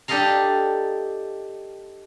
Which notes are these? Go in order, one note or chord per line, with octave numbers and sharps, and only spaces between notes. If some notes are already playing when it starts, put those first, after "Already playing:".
D4 G4 A4 D#5 F5 A#5